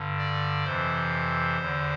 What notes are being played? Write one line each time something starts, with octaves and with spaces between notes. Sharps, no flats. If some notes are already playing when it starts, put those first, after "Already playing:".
Already playing: G2 D3
D5
F2 C3 E3 C5
E2 D3